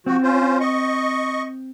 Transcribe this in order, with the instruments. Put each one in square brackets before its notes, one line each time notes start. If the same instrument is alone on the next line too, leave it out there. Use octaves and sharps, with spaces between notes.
[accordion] F3 F#4 [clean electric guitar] C4
[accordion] C#4 F4 C5
D#5 C#6